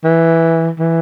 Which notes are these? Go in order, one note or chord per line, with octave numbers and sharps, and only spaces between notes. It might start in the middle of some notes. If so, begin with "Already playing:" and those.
E3
E3